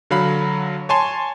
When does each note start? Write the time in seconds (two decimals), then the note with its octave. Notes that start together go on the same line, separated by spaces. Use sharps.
0.10 D3 F#3 F5 B5
0.89 C#5 G#5 A5 C6